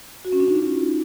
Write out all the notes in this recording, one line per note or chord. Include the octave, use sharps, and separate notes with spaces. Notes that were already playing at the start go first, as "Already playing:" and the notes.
F#4
C#4
D4
D#4
F4